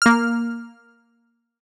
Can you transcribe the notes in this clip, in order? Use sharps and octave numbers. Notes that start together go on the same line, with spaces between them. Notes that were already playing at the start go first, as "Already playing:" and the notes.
A#3 F6